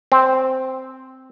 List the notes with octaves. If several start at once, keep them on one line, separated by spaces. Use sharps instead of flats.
C4